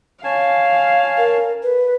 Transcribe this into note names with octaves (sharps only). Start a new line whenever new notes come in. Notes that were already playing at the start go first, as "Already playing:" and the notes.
C#4 F5 G#5 A5
A#4
B4